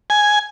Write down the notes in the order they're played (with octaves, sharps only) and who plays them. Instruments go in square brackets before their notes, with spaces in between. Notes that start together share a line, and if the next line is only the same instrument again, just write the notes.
[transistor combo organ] G#5